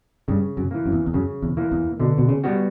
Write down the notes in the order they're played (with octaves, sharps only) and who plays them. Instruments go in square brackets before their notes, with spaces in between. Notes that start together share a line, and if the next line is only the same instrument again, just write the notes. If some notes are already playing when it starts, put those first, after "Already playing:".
[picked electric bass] G2 [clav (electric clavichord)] C#3
[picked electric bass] F#2
[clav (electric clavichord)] E3 A#3
[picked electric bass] F#2
E2
E2
[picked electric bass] F#2 [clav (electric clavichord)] C#3
[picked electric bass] E2
[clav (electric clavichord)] E3 A#3
[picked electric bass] E2
[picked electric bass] B2 [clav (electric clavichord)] D3
[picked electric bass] B2
C#3
[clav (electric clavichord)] G3 B3 F#4